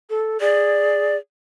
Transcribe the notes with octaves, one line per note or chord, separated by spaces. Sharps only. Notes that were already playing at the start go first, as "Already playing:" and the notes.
A4
G#4 D5